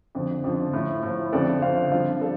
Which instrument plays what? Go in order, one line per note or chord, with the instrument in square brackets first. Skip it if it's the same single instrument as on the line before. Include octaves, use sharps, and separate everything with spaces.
[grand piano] F2 D3 F3
F2 D3 F3
A2 F3
A2 F3
F2 D3 F3 A4 D5
F2 D3 F3 C5 F5
G2 F3 C4 F4
F3 A4 D5